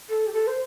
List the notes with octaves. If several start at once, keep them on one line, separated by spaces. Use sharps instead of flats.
A4
G4
A4
C5